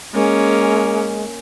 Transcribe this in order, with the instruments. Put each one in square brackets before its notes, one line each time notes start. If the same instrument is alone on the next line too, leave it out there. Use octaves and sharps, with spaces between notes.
[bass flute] G#3 [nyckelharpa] A#3 C#4